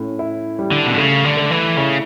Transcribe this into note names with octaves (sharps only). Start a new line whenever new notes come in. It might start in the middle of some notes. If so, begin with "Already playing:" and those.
Already playing: A2 C#4
E4
G3
D3
B2
C#3 A3
D3
A3
E3
C#3 E4